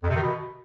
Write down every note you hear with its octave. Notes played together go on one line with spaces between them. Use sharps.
F2
C3
D#3
B2